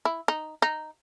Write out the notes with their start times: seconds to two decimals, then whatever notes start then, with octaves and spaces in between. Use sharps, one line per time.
0.05 E4
0.28 D#4
0.62 D#4